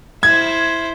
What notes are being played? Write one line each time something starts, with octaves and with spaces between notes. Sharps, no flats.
E4 C5 G#6